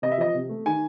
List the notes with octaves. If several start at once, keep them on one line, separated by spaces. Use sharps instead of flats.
C3 D#5
E5
F3 D#5
C3
A3
D#3 G#5